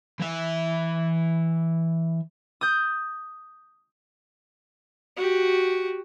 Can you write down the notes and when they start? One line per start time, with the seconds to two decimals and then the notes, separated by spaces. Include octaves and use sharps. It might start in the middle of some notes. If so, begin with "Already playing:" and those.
0.20 E3 E5
2.61 D#6 G6
5.16 F#4 G4